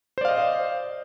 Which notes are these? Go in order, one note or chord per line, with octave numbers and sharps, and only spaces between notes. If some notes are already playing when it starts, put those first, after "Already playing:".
C5 D5 D#5 F5